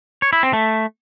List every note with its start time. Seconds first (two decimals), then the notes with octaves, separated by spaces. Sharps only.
0.22 C#5
0.33 E4
0.43 C4
0.53 A3